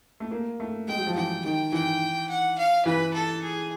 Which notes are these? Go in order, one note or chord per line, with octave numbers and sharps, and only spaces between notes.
A3
A#3
A3
G#3 G5
F#3
F3
E3 G5
D#3 G5
E3 G5
F#5
F5
E3 B4
A4
G#4